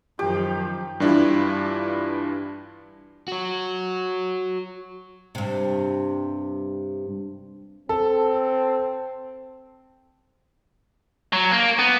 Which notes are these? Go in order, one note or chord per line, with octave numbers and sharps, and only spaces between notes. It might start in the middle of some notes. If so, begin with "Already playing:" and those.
F#2 D#3 F3 G4
G2 E3 D4 E4 F4 G4
F#4 C#5
G2 C3
C4 A4
F#3
A#3
B3